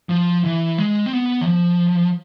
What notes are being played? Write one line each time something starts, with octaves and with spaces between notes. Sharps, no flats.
F3
E3
G#3
C4
B3
E3
F3